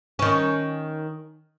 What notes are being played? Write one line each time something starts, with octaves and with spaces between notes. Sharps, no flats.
D#3 C#4